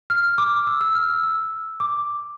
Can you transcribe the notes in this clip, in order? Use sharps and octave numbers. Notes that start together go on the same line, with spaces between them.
F6
D6
E6
E6
F6
E6
E6
D6